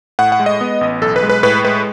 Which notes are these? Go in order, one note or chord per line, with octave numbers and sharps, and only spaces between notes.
A2 F#5
F#5
G#3
D#5
B3
A1
B1 A4
B4
G#3
B4
A2 B4
G#3 B4